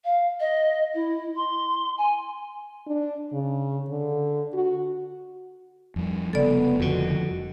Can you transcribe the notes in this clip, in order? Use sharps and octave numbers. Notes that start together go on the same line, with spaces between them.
F5
D#5
E4
C6
G#5
D4
C#3
D3
F#4
F2 G3
F1 C#3 G3 B3 A4 D5
F2 D3 D#3 F#4